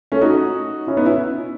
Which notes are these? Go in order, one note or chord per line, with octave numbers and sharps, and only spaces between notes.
A3 C#4
D#4 F#4
C#4 E4
B3 D#4
C#4 E4